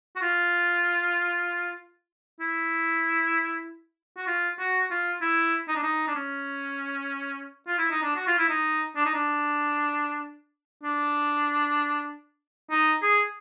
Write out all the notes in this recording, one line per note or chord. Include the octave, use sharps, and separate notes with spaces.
F#4
F4
E4
F#4
F4
F#4
F4
E4
D#4
D4
D#4
D4
C#4
F4
E4
D#4
D4
F#4
F4
E4
D#4
D4
D#4
D4
D4
D#4
G#4